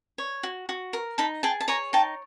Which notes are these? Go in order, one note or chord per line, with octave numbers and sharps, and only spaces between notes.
C#5
F#4
F#4
A#4
D#4 A5 B5
G#4 G5 A5
A5
C#5 G#5 A#5
D#4 G5 A5